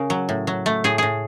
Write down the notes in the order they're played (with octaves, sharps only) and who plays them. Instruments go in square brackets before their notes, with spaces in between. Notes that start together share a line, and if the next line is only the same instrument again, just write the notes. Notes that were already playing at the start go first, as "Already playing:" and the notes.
Already playing: [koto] C#3 A#4
F#3
A2
F#3
A3
A2 G#4
A2 G#4